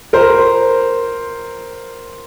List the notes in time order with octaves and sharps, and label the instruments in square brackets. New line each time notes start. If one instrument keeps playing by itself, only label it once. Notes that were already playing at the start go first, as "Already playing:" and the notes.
[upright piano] A#4 C5